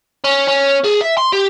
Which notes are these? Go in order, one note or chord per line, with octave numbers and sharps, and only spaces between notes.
C#4
C#4
G#4
E5
C6
G4